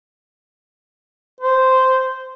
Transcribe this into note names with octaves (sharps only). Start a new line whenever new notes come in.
C5